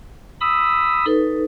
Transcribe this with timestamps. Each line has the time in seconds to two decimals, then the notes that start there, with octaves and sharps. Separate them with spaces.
0.41 B5 D#6 E6
1.06 D#4 A4 B4